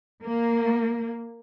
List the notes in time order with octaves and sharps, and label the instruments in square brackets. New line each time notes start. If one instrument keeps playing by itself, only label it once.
[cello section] A#3